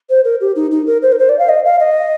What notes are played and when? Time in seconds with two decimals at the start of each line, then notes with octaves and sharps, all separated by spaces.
0.09 C5
0.24 A#4
0.40 G4
0.55 D#4
0.71 D#4
0.86 A#4
1.02 C5
1.12 A#4
1.18 C5
1.29 D5
1.38 F5
1.48 D#5
1.65 F5
1.79 D#5